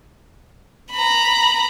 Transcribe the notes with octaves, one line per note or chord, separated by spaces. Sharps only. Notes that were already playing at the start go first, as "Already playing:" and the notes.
A#5 B5